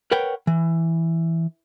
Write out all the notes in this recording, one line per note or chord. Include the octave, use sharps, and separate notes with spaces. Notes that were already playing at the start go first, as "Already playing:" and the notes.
A#4 B4 C#5 F#5 G5
E3